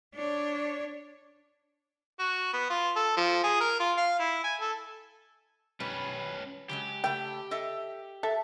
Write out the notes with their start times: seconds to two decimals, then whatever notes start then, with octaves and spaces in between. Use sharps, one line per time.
0.14 D4 C#5
2.19 F#4
2.53 B3
2.70 F4
2.96 A4
3.17 F3
3.44 G#4
3.60 A#4
3.80 F4
3.97 F5
4.19 E4
4.44 G#5
4.61 A4
5.80 B2 G3 C#4 B4
6.69 C#3 F#3 G#3 G4
7.04 C#3 A3 G5
7.51 A4 D#5 E5
8.23 A4 E5